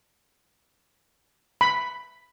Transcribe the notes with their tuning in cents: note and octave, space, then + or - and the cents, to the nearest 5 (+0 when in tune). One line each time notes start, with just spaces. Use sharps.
B5 +5